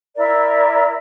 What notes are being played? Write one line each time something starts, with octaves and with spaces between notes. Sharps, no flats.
E4 A#4 D5 E5